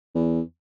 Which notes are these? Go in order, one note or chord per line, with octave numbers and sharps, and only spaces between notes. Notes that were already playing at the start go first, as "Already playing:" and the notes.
E2